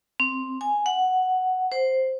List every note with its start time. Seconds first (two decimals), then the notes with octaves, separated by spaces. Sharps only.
0.20 C4
0.61 G#5
0.86 F#5
1.72 C5